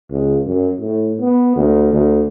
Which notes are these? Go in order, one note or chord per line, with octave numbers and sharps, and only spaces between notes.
C#2
F#2
A2
B3
D2
D2